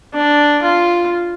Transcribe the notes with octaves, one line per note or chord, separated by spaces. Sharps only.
D4
F4